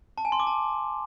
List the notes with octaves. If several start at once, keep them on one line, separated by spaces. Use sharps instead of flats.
A5
G#5
C6
D6
A5